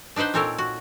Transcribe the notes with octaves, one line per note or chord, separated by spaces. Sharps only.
D4 D#4 B4 C5 F#5
A#2 C4 A4 A#4 C#5 F5
F#4